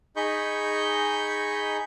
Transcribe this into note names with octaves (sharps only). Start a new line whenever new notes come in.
D#4 G#4 D#5 B5 C#6 G6